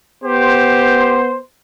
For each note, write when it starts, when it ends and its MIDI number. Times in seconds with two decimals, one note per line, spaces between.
0.24 1.40 59
0.24 1.19 67
0.24 1.40 72